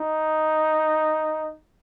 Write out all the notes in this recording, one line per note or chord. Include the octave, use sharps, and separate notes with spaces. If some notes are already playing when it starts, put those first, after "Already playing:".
Already playing: D#4